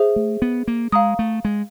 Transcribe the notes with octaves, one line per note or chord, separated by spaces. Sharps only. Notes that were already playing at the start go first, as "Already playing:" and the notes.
Already playing: G#4 C5 E5
A3
B3
A#3
G#3 F5 A#5 D#6
A3
G#3